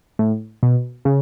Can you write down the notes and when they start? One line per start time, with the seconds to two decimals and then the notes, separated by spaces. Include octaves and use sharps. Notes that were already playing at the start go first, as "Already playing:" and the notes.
0.19 A2
0.63 B2
1.05 C#3